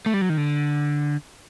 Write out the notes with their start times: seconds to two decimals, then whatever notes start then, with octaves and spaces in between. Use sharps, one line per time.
0.06 A3
0.14 G3
0.21 F#3
0.29 D#3
0.37 D3